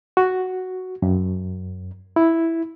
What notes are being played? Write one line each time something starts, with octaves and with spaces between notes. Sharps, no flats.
F#4
F#2
E4